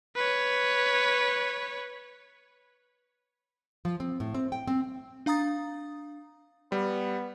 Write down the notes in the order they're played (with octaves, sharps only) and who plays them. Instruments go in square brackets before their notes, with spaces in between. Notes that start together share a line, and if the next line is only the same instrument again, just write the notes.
[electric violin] B4 C#5
[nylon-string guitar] F3
C4
A2
C4
G5
C4
[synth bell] D4 F5 A#5 D#6 A6
[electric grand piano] G3 [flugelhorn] B3